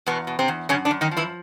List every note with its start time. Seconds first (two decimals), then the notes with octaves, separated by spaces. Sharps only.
0.06 E2 B2 B3
0.27 B2
0.39 C3 C4
0.48 E2
0.69 F#2 C#3 C#4
0.85 D3 D4
0.91 F#2
1.01 D#3 D#4
1.11 F3
1.17 E3 E4